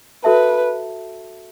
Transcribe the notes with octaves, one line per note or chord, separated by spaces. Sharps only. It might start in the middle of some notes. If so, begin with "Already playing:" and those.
F#4 A4 B4 E5 A5